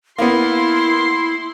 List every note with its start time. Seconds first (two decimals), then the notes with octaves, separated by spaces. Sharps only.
0.18 A#3 B3 E4 C6